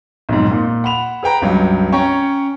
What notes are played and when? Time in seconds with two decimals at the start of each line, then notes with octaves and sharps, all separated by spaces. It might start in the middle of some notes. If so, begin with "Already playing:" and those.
0.29 B1 F2 G#2
0.51 A#2
0.84 F#5 B5 E7 F7
1.23 G#4 B4 G5 A#5
1.42 C#2 G2 F#3
1.92 C#4 C#5 G5 A#5